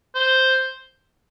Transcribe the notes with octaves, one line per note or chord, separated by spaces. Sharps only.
C5